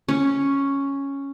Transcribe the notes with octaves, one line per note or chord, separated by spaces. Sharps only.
C#4